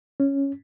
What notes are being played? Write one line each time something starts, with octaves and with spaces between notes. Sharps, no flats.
C#4